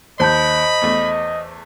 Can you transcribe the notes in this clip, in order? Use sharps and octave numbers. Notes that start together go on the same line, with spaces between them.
D#2 C5 D#5 A5 B5 G6
E2 A3